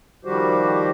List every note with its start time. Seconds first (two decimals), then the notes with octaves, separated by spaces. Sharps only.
0.25 D#3 F3 G3 F#4 G4 C5